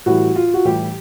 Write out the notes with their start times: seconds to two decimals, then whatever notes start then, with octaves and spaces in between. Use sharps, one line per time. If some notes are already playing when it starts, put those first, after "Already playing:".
0.06 A2 E3 G3 F#4
0.36 F4
0.54 F#4
0.65 A2 E3 G3 G4